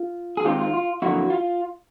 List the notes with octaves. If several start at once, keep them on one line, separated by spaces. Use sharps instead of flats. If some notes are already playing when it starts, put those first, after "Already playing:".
Already playing: F4
G#4
D#3 G#3 C4 D#4 F4 G4
F4
F4
F2 D3 F#3 A#3 E4 F#4
F4